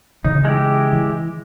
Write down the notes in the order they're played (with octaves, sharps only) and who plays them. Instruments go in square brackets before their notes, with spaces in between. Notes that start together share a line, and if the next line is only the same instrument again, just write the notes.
[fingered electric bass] C#3 E3 [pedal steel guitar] D#4
[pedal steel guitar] G#3 E4 G4
[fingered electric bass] E3